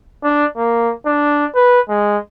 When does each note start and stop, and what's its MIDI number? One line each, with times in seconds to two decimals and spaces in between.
0.24 0.45 62
0.57 0.93 58
1.06 1.46 62
1.55 1.80 71
1.89 2.18 56